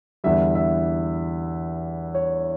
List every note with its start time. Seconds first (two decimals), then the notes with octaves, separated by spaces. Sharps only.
0.24 E2 D3 G3 E5
0.55 E5
2.15 C#5